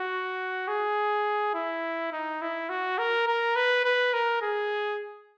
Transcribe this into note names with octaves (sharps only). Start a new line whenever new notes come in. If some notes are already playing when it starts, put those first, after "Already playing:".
Already playing: F#4
G#4
E4
D#4
E4
F#4
A#4
A#4
B4
B4
A#4
G#4